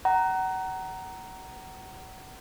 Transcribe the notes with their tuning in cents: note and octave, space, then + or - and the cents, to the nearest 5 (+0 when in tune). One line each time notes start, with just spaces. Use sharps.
F#5 +30 A#5 +0